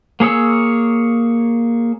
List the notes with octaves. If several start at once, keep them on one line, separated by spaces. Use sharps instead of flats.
A#3 G#4 C#5 E6